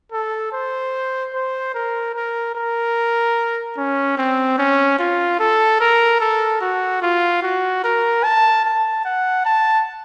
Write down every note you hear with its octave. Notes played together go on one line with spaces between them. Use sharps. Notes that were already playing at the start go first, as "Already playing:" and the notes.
A4
C5
C5
A#4
A#4
A#4
C#4
C4
C#4
F4
A4
A#4
A4
F#4
F4
F#4
A#4
A5
A5
F#5
A5